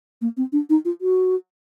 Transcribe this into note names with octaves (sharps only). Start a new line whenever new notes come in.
A#3
C4
D4
D#4
F4
F#4